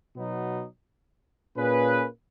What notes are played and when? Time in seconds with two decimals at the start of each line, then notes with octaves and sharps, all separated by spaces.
0.14 B2 F#3 B3 D#4
1.56 A#2 A#3 C#4 G#4 B4